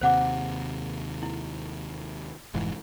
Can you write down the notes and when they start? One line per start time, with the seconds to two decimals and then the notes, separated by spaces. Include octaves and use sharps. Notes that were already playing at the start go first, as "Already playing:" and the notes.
0.01 D#2 C3 C5 F#5 D6
1.23 E4
2.54 F1 G#2 E3